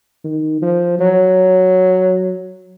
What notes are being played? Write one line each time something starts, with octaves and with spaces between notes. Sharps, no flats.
D#3
F3
F#3